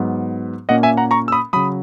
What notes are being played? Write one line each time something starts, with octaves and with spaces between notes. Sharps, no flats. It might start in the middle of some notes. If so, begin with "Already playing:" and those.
Already playing: G#2 F#3 B3
A#2 A#3 C#4 D#5 F#5
E5 G#5
F#5 A#5
A#5 C#6
E6
B5 D#6
C#3 F#3 B5 D#6